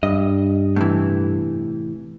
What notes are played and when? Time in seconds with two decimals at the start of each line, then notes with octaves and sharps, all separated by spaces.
0.03 G2 D#5
0.76 A2 C3 E3